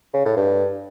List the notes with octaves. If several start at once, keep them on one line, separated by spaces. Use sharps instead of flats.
C#3
A2
G2